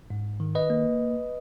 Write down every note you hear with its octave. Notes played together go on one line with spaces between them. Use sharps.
G#2
D#3
B4 D#5
A#3